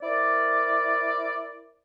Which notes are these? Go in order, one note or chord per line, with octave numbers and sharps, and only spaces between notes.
E4 A#4 C5 D5